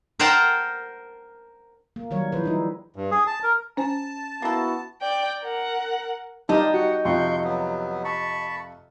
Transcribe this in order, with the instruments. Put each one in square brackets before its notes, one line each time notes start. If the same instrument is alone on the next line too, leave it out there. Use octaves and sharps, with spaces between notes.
[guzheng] A#4 C5 F#5 G5 A5 A#5
[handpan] A#3
D#3 F#3 G3 A#4 C#5
E3 F3 G3 G#4 B4 C5
G3 D#4 E4
[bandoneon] G2
G#4
A5
A#4
[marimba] C#4 C5 G#5 [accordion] A5
[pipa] A#3 A4 [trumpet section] B3 E4 F#4
[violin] D5 G5
A#4 F#5
[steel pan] G3 D#4 [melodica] D4 F4 [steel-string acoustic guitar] G4 D#5 [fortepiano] A5
[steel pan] F#4 [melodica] F#5
[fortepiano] F2 C3 [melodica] G5 C6 C#6
[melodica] F#3 B3
A5 B5 C#6